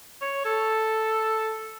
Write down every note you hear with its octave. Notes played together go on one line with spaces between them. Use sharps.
C#5
A4